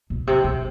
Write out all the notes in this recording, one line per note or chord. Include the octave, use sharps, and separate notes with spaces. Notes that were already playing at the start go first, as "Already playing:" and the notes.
B2
C3
B2